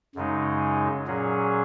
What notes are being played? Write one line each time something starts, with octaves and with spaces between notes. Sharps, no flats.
F#2 C#3 G#3 D#4
A#2 F#3 C#4 G#4